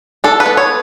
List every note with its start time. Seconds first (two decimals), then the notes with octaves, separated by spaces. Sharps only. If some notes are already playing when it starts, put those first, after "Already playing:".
0.24 D4 A4
0.40 B4
0.46 B3
0.57 C#5